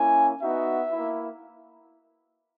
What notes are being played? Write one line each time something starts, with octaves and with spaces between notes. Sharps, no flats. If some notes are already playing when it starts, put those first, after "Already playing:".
Already playing: A#3 C#4 E4 G#5
B3 D#4 F#4 E5
A#3 E4